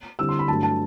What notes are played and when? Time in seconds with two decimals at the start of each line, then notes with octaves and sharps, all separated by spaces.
0.19 D3 G3 C4 E4 E6
0.29 C6
0.39 B5
0.48 G2 F#3 A3 A5
0.63 A5